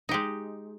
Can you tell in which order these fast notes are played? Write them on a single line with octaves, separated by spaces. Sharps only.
D#4 G4 G#3